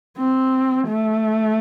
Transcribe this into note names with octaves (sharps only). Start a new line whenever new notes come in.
C4
A3